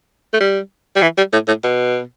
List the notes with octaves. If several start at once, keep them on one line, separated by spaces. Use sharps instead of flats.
A3
G3
G3
E3
G3
A2
A2
B2